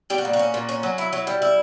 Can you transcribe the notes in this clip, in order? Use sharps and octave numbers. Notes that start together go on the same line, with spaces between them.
G3 G4
F#4
A#2
F#4
C#4
A#2
C#4
F#3
E4
F#3
G3
E4